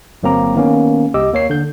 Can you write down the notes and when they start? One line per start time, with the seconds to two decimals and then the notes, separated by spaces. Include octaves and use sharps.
0.23 G1 F#3 A#3 C4 A#5 D6
0.56 D#3 A#3 B3 C#4
1.14 C2 G4 D#5 D6 E6
1.32 D#2 A#3 C#5 C7
1.50 D3 G6